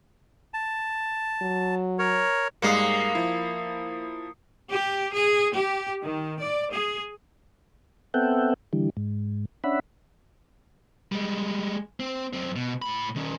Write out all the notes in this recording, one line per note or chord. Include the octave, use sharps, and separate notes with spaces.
A5
F#3
A#4 C#5
G#2 G3 G#3 A#3 D#6 C7 C#7
F3 E4
G4
G#4
G4
D#3
D5
G#4
B3 C4 A4 E5 F#5 G5
D3 E3 G3
G#2
C#4 D4 E5 F#5 B5
G3 G#3
C4
F#2 C4
B2
A2 B5
D#3 C#4